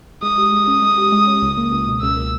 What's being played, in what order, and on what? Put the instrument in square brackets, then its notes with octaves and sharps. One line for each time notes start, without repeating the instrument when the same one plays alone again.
[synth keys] G#3 [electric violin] D#6
[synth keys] G4
G#3
C#4
G#3
G4
G#3
C#4
C#2
A#3
C#2
B2
[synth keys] C#2 [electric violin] E6
[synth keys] A#3